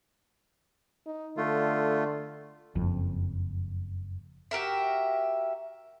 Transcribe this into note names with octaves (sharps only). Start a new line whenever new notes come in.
D#4
D3 A3 F4
F#1 F2
F#4 G4 A#4 E5